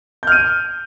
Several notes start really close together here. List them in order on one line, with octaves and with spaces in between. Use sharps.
G6 F6 D#7